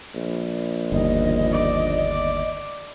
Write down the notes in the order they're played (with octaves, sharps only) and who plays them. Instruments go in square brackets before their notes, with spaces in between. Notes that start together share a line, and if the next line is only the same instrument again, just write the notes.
[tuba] A#1
[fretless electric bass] G1 D#2 [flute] D#5
[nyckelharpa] D5